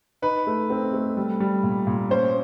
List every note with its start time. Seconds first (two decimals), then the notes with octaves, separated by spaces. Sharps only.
0.22 D#4 B4
0.47 A3
0.70 C4
0.93 A3
1.17 G3
1.40 G3
1.63 A#2
1.87 A#2
2.10 C#4 C5